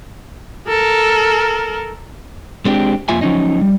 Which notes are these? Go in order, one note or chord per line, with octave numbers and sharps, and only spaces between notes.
A4 A#4
G#3 C4 D4 G4
F2 F3 A#3 F4 E5 G#5
F3 F#3 C#4 D#4 D#5
G3